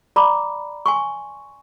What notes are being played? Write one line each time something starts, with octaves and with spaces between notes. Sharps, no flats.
D5 A#5 B5 D6
G#5 C6 C#6